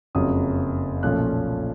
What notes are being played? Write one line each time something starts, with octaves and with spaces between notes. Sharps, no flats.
F#1 F2 C#3 F#3 D#6
B1 A#2 F3 A3 C#4 F#6